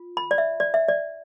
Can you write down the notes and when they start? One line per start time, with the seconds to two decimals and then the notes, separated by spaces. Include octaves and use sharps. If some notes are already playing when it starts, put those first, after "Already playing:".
Already playing: F4
0.17 B5
0.31 D5
0.38 E5
0.60 D5
0.74 E5
0.88 D5